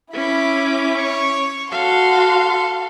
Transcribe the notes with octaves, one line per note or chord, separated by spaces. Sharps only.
C#4 E4 B5 D6
C#5
F#4 A4 F5 C6